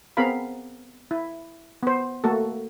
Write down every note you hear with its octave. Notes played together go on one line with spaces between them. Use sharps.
B3 C4 G#4 A#4 F5 B5
E4
B3 C5
A3 A#3 F#4 A4